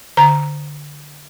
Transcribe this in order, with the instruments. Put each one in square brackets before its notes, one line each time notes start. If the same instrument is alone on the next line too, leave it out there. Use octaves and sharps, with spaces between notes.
[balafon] D3 A#5